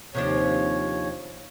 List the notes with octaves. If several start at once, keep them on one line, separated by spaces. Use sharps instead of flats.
D#2 C3 F3 D4 C#5